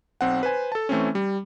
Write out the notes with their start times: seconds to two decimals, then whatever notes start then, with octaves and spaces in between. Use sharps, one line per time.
0.21 B1 C4 F#5
0.43 B4 C5 G#5
0.72 A4 A5
0.89 E3 A3 C4 C#4
1.15 G3